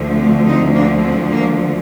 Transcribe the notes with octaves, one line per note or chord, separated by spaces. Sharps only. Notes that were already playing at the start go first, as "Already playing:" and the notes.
Already playing: D2 D3 F3 A3
C4
C4 D#4
A#3 D4
C4
A#3